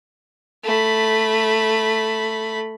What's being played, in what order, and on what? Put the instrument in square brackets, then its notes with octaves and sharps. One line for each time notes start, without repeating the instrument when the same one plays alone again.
[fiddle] A3 B5